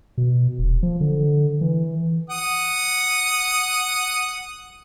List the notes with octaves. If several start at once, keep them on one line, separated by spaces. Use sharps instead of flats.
B2
D#1
F3
D3
E3
F#5 D#6